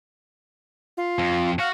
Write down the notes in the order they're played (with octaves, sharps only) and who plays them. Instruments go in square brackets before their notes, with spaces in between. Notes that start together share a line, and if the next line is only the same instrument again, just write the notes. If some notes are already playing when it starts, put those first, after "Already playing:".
[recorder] F4
[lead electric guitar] F2
[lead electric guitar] F#4 [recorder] F5